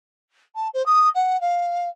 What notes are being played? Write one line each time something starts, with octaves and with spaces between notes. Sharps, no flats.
A5
C5
D#6
F#5
F5